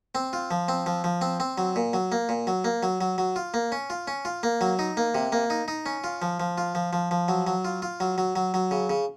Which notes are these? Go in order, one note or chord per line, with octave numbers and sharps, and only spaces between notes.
C4
F4
F3
C4
F3
F3
C4
C4
F#3
A#2
F#3
A#3
A#2
F#3
A#3
F#3
F#3
F#3
F4
A#3
C#4
F4
C#4
F4
A#3
F#3
D#4
A#3
C3
A#3
D#4
D#4
C#4
F4
F3
F3
F4
F3
F3
F3
F#3
F#3
F4
F4
F#3
F#3
F#3
F#3
C#3
C#3